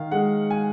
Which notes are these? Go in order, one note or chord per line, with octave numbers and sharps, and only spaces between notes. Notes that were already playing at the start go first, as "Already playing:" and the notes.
Already playing: D#3 F5
G#3 F#5
G#5